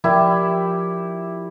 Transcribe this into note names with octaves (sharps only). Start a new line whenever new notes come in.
F3 E4 G4 A#4 D5